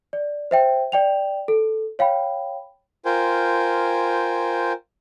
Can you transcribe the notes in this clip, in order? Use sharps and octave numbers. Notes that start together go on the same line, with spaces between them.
D5
C5 E5 G5
D5 G5 F7
A4
C#5 F5 G5 B5
F4 A#4 C5 G5 G#5